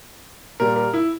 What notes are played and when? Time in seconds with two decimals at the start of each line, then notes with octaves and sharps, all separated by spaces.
0.60 A#2 G3 A#4
0.76 A#4
0.94 E4